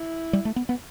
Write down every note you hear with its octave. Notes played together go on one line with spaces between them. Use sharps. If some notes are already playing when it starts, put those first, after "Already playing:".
Already playing: E4
G3
A3
B3
B3